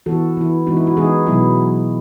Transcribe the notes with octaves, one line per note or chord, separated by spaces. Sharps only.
E3 B3 E4 F#4 A4
E3 B3 E4
E3 G#3 B3 D#4 F#4
E4
F#4
E3 G#3 B3 D#4 E4 G#4
B2 F#3 B3 E4